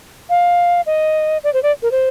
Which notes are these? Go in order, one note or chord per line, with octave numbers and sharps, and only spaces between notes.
F5
D#5
D5
C5
D5
A#4
C5